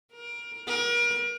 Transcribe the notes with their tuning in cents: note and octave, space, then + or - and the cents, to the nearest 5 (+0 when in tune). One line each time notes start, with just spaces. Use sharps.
A#4 +30
A#4 +40